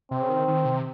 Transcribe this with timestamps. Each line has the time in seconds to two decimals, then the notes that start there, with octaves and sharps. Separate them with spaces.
0.11 C3 C4
0.22 C#3
0.29 D#3
0.48 D#3
0.65 C3